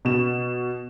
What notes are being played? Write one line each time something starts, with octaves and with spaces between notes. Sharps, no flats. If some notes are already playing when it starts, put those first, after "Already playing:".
B2 E7